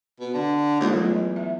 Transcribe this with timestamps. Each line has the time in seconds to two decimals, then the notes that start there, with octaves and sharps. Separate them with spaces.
0.20 B2
0.34 D3
0.80 D#2 G#3 F4 A4
0.93 E2 F#3 A3 F4
1.36 E5